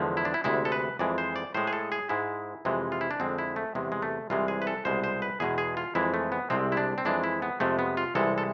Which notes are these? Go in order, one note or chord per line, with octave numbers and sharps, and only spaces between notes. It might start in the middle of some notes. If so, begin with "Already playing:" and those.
Already playing: E2 D3 F3 G#3
E4
D4
E4
D2 C3 G#3 E4
A4
B4
F2 E3 G#3 D5
C5
D5
A2 G#3 C5
G#4
A4
G#4
G#2 G#3 E4
F2 C3 E3 G#3
F4
E4
D4
F2 D3 G#3 C4
E4
A3
E2 C3 G#3
G#3
A3
C2 C3 E3 G#3 F4
G#4
B4
A4
C2 B2 G#3 C5
C5
B4
E2 B2 G#3 G#4
G#4
F4
F2 E3 G#3 E4
A3
B3
C2 C3 G#3 C4
E4
D4
C4
F2 E3 G#3 D4
E4
B3
F2 C3 G#3 A3
B3
F4
C2 C3 E3 G#3 A4
A4